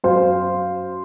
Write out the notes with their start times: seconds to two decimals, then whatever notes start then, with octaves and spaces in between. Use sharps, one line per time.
0.04 F#2 C5 F5